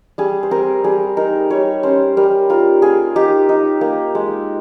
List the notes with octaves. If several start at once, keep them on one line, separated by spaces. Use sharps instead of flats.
G3 G#4
C5
C4 A#4
G3 G#4
D#4 A#4
G3 C#5
C#4 C5
G3 A#4
F4 A#4
A#3 G#4
D#4 G4
D#4
A#3
G#3